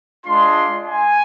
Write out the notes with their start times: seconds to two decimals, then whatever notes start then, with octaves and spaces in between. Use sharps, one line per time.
0.25 G#3 D4 F4 C6
0.87 G#5